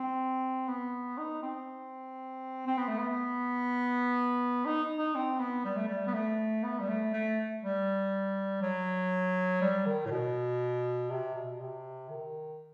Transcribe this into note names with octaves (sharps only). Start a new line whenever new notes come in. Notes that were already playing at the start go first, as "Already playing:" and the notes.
Already playing: C4
B3
D#4
C4
C4
B3
A3
B3
D#4
D#4
C4
B3
G3
A3
G3
B3
A3
B3
G3
A3
A3
G3
F#3
G3
D#3
A2
B2
C3
B2
C3
D#3